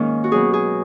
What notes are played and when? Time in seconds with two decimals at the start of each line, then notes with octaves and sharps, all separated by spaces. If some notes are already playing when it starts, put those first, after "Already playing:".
Already playing: G#2 D#3 A#3 C#4
0.24 F#4
0.31 B2 F#3 C#4 G#4
0.53 G#4